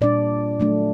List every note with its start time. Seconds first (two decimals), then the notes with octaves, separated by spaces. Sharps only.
0.01 A#2 G3 D4 D5
0.60 F#3 A3 D4